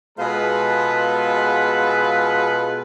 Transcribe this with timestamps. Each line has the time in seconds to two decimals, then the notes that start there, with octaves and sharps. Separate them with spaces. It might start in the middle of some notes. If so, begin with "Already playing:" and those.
0.18 B2 G#3 F4 G#4 A4 B4